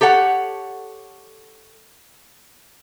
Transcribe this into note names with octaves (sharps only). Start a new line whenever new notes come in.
G4 A4 C#5 F#5